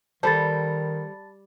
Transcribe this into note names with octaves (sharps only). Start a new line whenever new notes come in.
D#3 G3 A4 C5 A5 B5 A6